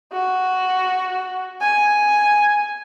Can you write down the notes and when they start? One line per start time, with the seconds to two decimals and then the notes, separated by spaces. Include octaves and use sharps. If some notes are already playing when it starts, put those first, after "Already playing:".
0.13 F#4
1.61 G#5